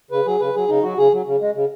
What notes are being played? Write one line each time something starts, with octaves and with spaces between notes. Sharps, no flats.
C#3 B4
F#3 G#4
C#3 B4
F#3 G#4
C#3 D#4
F#3 F#4
C#3 G#4
F#3
C#3
G#3
C#3